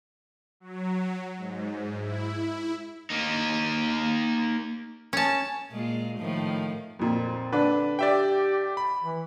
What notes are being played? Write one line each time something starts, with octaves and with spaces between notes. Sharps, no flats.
F#3
G#2
E4
A#3 D#4
C#4 A5
A#2 G#3 F4
A2 D#3 F3
F2 A#2 C4
D3 D4 B4
G4 D5 E5 G5
B5
E3